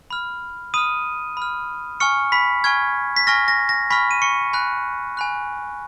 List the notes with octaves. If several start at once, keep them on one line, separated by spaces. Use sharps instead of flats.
B5 F6
B5 D#6 F6 D#7
B5 F6
G#5 C#6 F6 C#7
B5 B6
G#5 C#6 F6 G#6
B6
G#5 C#6 F6 A#6
A#6
A#6
G#5 B5 C#6 F6 B6
D#7
C#6 C#7
G#5 B5 F#6
G#5 B5 F#6